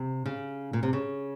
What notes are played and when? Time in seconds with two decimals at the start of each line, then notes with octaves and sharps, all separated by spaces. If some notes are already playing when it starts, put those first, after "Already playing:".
Already playing: C3
0.26 C#3
0.73 A#2
0.83 C3
0.93 C#3